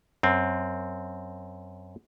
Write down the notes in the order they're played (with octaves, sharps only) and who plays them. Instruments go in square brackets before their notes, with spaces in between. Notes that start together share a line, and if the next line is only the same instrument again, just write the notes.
[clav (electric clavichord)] F#2 C4